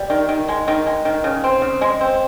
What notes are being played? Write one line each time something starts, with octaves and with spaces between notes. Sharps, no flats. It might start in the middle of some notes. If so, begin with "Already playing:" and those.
Already playing: G3
D#3
D#3
G#3
D#3
G#3
D#3
C#3
C4
C#3
G#3
C4